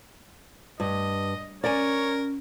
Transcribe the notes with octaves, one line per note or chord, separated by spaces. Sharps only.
G2 D#5
C#4 A#4 C#5 D5 G#5